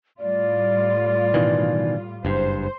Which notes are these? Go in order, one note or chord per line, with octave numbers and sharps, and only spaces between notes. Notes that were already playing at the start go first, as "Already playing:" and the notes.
A2 G3 F4 D5
B2 D#3 E3
F#1 G2 C5